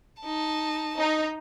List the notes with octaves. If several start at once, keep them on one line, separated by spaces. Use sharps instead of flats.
D#4 A5
D#4